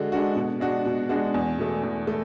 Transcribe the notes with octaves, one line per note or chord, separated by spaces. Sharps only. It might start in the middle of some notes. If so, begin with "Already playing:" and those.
Already playing: D3 G#3 D4 F#4
G#3 D4 F#4
B2
G#3 D4 F#4
B2
G#3 D4 F#4
E2
B2 A3
E2
A3